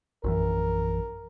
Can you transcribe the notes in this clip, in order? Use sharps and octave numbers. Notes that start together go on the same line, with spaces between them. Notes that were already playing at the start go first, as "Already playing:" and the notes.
A#1 F#2 E3 A#4